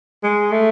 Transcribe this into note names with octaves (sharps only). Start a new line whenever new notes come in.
G#3
A3